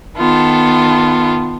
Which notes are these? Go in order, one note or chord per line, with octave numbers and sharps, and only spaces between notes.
D#3 B3 F4 A4